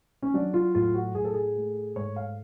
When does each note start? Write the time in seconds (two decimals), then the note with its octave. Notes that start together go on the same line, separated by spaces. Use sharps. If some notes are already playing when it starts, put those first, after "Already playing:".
0.22 C#4
0.34 F#3 D4
0.54 F4
0.75 A2 F4
0.95 F#4
1.15 A2 G#4
1.25 A4
1.34 G#4
1.56 A3
1.96 G#2 C#5
2.16 F5